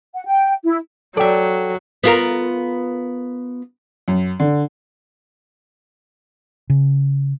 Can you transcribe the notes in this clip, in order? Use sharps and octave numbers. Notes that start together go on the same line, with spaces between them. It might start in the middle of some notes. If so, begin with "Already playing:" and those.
F#5
G5
E4
F#3 A4 D5 E5 G5
B3 F4 A#4
F#2
D3
C#3